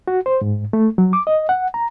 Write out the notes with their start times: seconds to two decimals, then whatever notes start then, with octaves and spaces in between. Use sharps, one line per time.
0.08 F#4
0.26 C5
0.41 G#2
0.73 A3
0.98 F#3
1.13 D6
1.27 D#5
1.49 F#5
1.74 A#5